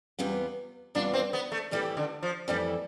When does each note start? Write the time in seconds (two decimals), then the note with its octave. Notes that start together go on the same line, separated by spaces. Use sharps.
0.19 E2 C3 G3 B3 F4
0.95 E2 C3 G3 B3 D4 F4
1.14 C4
1.33 B3
1.52 A3
1.71 F2 E3 G3 A3 E4 G4
1.97 D3
2.23 F3
2.48 F2 E3 G3 A3 E4 G4